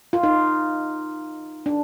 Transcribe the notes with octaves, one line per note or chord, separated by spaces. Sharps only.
F4
D#4
D4